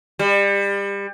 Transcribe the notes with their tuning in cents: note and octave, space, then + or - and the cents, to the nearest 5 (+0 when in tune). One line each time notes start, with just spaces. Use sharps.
G3 +30